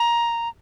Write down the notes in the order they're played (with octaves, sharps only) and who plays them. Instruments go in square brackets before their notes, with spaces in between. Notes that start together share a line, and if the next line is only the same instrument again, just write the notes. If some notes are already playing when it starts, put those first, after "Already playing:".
Already playing: [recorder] A#5